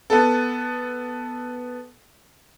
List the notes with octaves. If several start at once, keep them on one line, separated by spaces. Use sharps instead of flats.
B3 A4